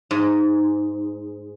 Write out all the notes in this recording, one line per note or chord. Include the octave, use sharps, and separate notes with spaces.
G#2